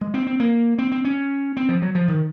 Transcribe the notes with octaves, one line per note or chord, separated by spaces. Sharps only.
G#3
C4
C4
A#3
C4
C4
C#4
C4
F3
F#3
F3
D#3